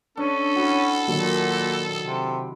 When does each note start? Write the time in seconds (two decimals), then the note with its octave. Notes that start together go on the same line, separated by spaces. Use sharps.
0.17 C#4 D4 A4
0.56 E4 F#4
1.08 A#2 D#3 F#3
2.02 C3